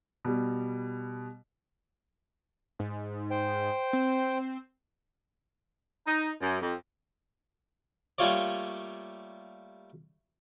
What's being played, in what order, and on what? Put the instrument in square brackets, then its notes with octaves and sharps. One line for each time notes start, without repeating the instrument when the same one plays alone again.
[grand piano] B2 G3
[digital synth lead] G#2
[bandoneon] C5 G5
[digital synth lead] C4
[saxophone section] D#4
F#2
F2
[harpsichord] G3 A3 A#3 F4 C#5 D5